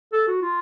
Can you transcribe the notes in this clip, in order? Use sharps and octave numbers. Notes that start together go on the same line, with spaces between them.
A4
F#4
F4